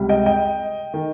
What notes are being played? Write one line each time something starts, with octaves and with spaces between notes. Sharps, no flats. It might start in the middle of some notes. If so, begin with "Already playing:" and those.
Already playing: C#2 C3 G3
D#5 G5
D#5 G5
D#3